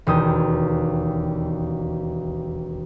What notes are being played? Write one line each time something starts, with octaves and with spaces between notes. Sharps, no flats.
E1 D#2 D#6 G6